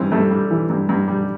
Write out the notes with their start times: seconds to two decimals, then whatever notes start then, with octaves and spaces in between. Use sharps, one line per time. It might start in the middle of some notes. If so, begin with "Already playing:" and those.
Already playing: G2 E3 C4
0.12 G2 A3
0.31 G3
0.51 E3
0.70 G2
0.89 G2
1.08 G3